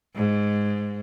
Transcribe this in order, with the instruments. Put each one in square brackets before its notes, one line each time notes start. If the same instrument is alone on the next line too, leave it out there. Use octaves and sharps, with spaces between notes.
[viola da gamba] G#2